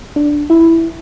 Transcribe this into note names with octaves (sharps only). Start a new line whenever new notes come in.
D4
E4